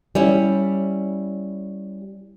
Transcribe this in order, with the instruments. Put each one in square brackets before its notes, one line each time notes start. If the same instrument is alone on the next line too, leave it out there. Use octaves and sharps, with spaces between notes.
[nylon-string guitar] G3 C#4 E4